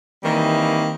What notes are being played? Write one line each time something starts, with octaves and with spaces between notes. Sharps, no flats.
D#3 E3 G3 A#3 C4 D#4